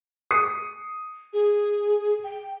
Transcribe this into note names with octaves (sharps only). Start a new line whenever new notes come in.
D#6 C7 C#7
G#4
G5